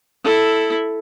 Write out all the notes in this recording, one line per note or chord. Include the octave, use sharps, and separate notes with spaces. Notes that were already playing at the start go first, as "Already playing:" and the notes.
E4 A4